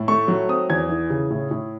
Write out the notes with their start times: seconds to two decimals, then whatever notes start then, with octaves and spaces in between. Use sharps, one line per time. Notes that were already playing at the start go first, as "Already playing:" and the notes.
Already playing: A2
0.08 A3 C#6
0.28 F#3
0.48 C4 D#6
0.70 E2 G#6
0.89 E3
1.10 C#3
1.30 A2
1.51 A2